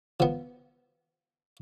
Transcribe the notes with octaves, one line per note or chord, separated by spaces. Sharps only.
F3 B3